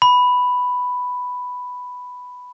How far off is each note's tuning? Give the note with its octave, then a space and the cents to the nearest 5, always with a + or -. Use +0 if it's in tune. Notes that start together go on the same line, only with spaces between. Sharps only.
B5 +5